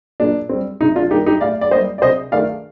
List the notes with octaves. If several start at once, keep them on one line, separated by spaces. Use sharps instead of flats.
A#2 D4
G3 C4
C3 D#4
D4 F4
D#3 G3 A#3 D#4 G4
D#4 G4
A2 D5 F5
D5
G3 A#3 C5 D#5
D5
C3 C5 D#5
D#3 A3 D5 F5